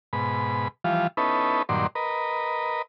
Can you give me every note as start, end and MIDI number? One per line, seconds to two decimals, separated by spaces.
0.13 0.68 44
0.13 0.68 47
0.13 0.68 83
0.84 1.07 52
0.84 1.07 53
0.84 1.07 55
0.84 1.07 65
1.17 1.62 59
1.17 1.62 61
1.17 1.62 63
1.17 1.62 64
1.17 1.62 69
1.17 1.62 71
1.69 1.87 43
1.69 1.87 46
1.69 1.87 51
1.69 1.87 54
1.69 1.87 74
1.69 1.87 84
1.95 2.82 70
1.95 2.82 71
1.95 2.82 75